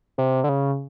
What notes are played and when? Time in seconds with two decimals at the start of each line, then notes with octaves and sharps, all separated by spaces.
0.18 C3
0.44 D3
0.49 C#3